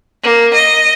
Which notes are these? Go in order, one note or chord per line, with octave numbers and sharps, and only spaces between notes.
A#3
D#5